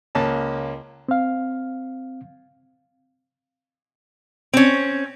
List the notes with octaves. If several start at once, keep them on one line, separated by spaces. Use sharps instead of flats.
C#2 A#3 C#4 A5
C4 F5
C4 C#4